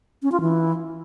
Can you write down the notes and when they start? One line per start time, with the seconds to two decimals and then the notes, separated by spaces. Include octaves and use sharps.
0.23 C#4
0.32 F4
0.41 E3